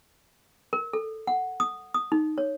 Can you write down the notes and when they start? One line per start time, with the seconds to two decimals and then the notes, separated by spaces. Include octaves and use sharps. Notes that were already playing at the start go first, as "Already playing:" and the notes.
0.73 A#4
0.93 A4
1.27 F#5
1.60 D#6
1.94 D#6
2.12 D#4
2.38 C#5